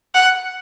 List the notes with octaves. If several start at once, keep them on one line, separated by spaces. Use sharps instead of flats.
F#5